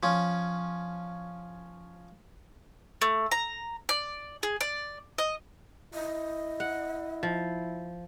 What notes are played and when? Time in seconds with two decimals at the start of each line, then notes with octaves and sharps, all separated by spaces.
0.03 F3 C#4
3.02 A3
3.31 A#5
3.89 D5
4.43 G#4
4.61 D5
5.18 D#5
5.94 E4 D#5
6.60 F#5
7.23 F3